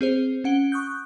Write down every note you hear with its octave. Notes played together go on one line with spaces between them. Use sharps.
C4 G#4 C5
C#4 F#5 D7 G7
C#6 D#6 F#6 G6